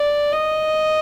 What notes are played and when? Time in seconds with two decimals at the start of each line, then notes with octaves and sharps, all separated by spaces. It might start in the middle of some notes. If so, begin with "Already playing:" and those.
Already playing: D5
0.32 D#5